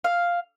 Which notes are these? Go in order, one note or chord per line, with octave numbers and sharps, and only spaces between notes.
F5